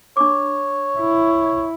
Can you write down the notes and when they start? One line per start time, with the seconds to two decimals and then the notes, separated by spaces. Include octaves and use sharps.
0.17 D4 C#5 D6
0.99 E4